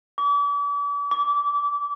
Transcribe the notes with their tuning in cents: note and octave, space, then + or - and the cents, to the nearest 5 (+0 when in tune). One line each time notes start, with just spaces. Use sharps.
D6 -40
D6 -25